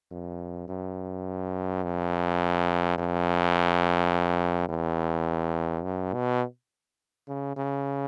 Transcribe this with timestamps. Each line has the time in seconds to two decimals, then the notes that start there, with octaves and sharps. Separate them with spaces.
0.11 F2
0.68 F#2
1.84 F2
2.98 F2
4.69 E2
5.84 F#2
6.13 B2
7.28 C#3
7.56 C#3